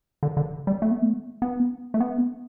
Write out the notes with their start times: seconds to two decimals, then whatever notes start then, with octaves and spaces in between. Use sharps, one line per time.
0.23 D3
0.37 D3
0.67 G3
0.82 A3
0.91 B3
1.02 A3
1.42 B3
1.94 A3
2.00 B3